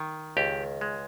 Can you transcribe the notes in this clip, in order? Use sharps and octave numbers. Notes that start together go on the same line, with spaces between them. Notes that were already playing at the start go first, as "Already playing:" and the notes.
Already playing: D#3
C#2 G4
G#3